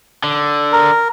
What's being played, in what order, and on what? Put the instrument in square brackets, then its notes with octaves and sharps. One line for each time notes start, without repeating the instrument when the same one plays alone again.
[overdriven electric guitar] D3
[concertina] A#4